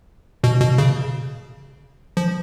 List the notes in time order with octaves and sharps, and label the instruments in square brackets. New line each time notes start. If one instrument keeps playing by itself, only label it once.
[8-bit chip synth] B2
B2
C#3
F3